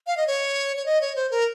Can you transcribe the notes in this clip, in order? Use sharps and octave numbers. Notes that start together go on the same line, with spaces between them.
F5
D#5
C#5
C#5
D#5
C#5
C5
A#4